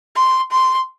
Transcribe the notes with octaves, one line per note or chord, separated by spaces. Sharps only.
C6
C6